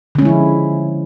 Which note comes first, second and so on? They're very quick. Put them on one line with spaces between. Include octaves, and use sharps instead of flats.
D3 C#4 G#3 E4 F3